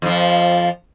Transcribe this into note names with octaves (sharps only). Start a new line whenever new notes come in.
F2 F3